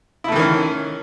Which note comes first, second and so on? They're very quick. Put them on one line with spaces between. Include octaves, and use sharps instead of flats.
E4 A3 E3 D#3 C#4